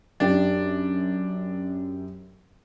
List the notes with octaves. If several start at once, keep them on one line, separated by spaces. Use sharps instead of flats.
F#2 D4 G4 G5